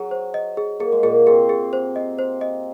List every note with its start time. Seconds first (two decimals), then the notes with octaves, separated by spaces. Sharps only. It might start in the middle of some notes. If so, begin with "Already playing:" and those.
Already playing: F#3 G#4
0.11 C5
0.34 D#5
0.57 G#4
0.80 A#3 G#4
0.92 G#3
1.03 A#2 A#3 G#4
1.26 C3 C4 G#4
1.49 G#4
1.73 C5
1.96 D#5
2.19 C5
2.41 D#5